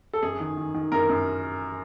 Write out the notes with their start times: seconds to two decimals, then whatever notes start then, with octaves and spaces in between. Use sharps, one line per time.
0.13 A4
0.22 F#2 G#4
0.40 D#3
0.57 D#3
0.74 D#3
0.92 F#2 A#4
1.09 F#2